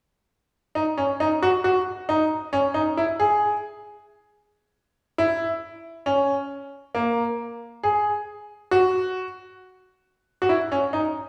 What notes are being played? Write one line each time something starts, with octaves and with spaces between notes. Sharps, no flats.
D#4
C#4
D#4
F#4
F#4
D#4
C#4
D#4
E4
G#4
E4
C#4
A#3
G#4
F#4
F#4
E4
C#4
D#4